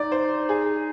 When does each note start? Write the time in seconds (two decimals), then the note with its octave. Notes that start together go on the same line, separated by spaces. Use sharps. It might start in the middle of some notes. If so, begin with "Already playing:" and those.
Already playing: D#4 D5
0.12 C5
0.49 G#4